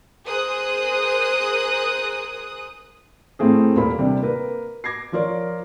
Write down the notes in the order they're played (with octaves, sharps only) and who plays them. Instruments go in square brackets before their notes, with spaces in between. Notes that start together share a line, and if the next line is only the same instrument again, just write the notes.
[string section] G#4 A#4 C5 D#6 F#6
[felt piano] A2 A3 C4 G#4
D#1 A#2 A#3 B5
C3 G3 D4
A#3 A#4 B4
D6 G#6 A#6 C7
F3 F4 A#4 C#5 D5